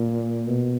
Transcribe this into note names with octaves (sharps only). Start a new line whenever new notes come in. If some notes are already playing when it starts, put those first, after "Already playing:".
Already playing: A#2
B2